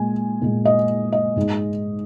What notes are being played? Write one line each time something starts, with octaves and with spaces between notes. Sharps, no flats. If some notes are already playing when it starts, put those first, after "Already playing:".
Already playing: A#2 G#3 G#5
A#2 G#3
D#5
D#5
G#2 G#3